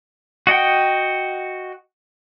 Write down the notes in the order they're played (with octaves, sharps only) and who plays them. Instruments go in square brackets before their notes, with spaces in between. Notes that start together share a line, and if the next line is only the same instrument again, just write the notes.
[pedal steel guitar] F#4 D#5 F#5 G5